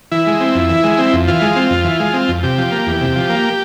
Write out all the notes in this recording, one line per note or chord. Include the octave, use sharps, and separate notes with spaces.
E3 E4
G#3
C4
F2
E3
G#3
C4
F2
E3 F4
G#3
C4
F2
E3
G#3
C4
F2
C3 G4
F3
A#3
E2
C3
F3
A#3